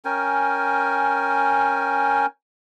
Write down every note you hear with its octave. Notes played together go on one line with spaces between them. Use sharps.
C#4 A#4 G5 G#5